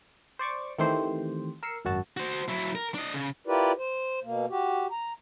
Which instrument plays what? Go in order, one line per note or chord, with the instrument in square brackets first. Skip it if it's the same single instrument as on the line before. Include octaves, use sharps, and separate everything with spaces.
[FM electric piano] C5 D5 C#6 D6
D#3 E3 A3 C4 G4 C5
A#4 E6 C7 C#7
G#1 F#2 F#4 A5
[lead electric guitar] F#4 C5
F#3 E4
A#4
D4 D#5
C#3
[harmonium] E4 F4 G4 A#4 B4 D5
C5
B2 A#3
F#4 G4
A#5